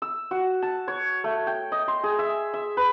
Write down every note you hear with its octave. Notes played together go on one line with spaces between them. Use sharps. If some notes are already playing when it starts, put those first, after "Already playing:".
E6
F#4
A5
C#5
A3
G5
D#5
C6
G#4
E5
E5
B4